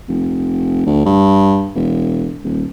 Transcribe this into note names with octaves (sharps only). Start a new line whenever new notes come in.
F1
D2
G2
E1
D#1